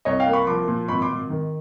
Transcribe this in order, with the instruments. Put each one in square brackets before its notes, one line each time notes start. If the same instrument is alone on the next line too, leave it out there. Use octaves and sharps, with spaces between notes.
[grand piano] C2 C#5 D#5
F5 G5
A#3
B5 C#6
F3 C6 D6
A#2
G#1 B5 C#6
C6 D6
G#1
D#3